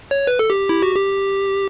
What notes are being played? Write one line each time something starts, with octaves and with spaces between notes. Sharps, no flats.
C#5
B4
A4
G4
E4
F#4
G4